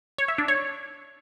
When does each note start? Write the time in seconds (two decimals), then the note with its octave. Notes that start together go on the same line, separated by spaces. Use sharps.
0.18 C#5
0.28 E5
0.38 D4
0.48 C#5